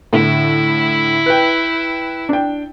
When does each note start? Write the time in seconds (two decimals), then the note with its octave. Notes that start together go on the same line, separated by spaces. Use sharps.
0.13 A2 D3 E4
1.26 B4 G5
2.29 D4 G5